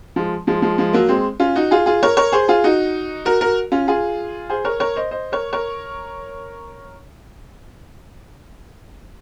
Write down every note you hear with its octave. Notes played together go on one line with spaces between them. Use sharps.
F3 G#3
F3 G#3
F3 G#3
F3 G#3
F#3 A#3
G#3 C4
C#4 F4
D#4 F#4
F4 G#4
F4 G#4
A#4 C#5
A#4 C#5
G#4 C5
F4 G#4
D#4 F#4
F#4 A#4
F#4 A#4
C#4 F4
F4 G#4
G#4 C5
A#4 C#5
A#4 C#5
C5 D#5
C5 D#5
A#4 C#5
A#4 C#5